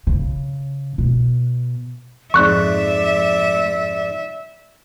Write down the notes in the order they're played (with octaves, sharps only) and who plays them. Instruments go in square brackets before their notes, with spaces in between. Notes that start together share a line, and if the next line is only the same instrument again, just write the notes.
[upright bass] C#3
B2
[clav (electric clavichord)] F2 G#2 [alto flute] D5 [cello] E5 [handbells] C#6 F#6